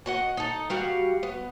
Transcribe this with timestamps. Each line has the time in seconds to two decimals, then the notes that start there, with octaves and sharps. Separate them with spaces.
0.06 F#4 D#5 F#5
0.37 D#4 A4
0.70 G3 F#4 F5
1.23 B3